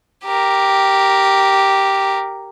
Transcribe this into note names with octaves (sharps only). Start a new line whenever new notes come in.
G4 A#4